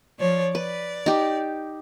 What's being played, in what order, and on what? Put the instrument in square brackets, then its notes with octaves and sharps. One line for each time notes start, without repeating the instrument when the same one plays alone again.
[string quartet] F3 C#5 D5
[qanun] B4 [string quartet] D5
[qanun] D#4 G4